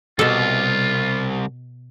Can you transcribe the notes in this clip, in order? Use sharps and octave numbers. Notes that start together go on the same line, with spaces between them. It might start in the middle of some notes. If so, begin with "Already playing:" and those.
C2 B2 F4 A4